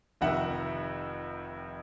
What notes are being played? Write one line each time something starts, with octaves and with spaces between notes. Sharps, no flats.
F1 F2 C3 D#3 E5 F#5